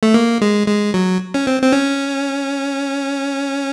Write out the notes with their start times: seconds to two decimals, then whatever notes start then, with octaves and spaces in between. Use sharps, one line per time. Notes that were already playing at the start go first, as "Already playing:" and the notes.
0.03 A3
0.14 A#3
0.42 G#3
0.68 G#3
0.94 F#3
1.34 C#4
1.47 C4
1.62 C4
1.72 C#4